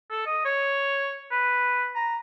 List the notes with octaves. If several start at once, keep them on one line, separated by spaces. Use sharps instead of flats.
A4
D#5
C#5
B4
A#5